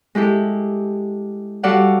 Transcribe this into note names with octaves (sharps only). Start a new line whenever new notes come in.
G#3 E4 G4 A4
G3 F#4 A4 D5 F5 F#5